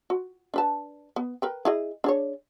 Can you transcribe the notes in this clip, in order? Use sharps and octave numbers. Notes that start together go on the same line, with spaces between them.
F#4
D4 B4 A5
B3
A#4 B4 G5
E4 G#4 D#5
D4 G#4 C#5